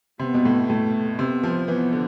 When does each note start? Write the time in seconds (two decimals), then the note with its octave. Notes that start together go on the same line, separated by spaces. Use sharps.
0.19 C3 B3
0.34 B2
0.45 A2
0.70 A2 A3
1.18 C3 B3
1.43 F3
1.68 E3 B3
1.93 D3